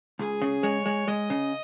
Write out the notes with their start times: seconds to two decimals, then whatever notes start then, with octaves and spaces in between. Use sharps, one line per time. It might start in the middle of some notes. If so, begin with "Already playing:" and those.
0.19 C#2 G#4
0.42 C#3
0.63 G#3 C#5
0.86 G#3
1.07 G#3 D#5
1.30 C#3